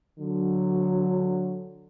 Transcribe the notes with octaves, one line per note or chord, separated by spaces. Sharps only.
D3 F#3